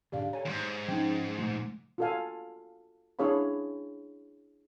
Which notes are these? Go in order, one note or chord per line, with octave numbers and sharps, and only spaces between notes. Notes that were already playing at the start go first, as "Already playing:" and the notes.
C#2 G#2 D3 G4 D5 F5
A4 C#5 G#5 A#5
D#2 G#2 C6
F3 C#4 D#4 G5
C#2 A#2 F3 A3
F4 F#4 A4 D5 F5 G#5
D4 E4 G#4 C#5 F5 B5